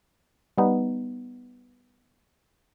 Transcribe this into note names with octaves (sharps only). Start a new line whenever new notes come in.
G3 B3 D#4